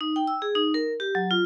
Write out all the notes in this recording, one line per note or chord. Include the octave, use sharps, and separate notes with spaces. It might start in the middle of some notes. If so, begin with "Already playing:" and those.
D#4
G5
E6
G#4
D#4
A#4
G4
F#3
F4